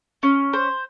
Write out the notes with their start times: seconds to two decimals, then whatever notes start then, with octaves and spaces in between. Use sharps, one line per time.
0.23 C#4
0.53 C5